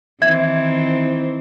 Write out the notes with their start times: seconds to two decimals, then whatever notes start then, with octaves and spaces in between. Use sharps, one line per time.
0.22 D#3 E3 C4 E5 G#6